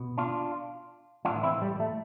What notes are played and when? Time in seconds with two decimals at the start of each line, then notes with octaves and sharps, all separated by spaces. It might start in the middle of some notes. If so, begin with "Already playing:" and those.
Already playing: B2
0.18 D4 F4
1.25 A2 E3 D4 F4
1.43 C4 E4
1.62 G3
1.80 A3